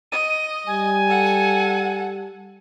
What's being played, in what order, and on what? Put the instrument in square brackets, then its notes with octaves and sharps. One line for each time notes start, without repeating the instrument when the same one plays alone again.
[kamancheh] D#5 [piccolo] D#7
[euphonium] G3 [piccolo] G#5
[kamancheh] A4 F#5